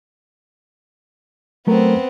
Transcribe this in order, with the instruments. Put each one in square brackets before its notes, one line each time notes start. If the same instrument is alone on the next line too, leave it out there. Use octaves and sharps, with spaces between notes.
[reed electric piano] F#3 A3 A#4 [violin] B3 C4